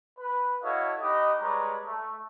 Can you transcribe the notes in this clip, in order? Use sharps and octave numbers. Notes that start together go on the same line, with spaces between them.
B4
E4 F#4 A4 C#5 D#5 F5
D#4 G4 B4 D#5
G3 G#3 B4 C#5 D5 A#5
A3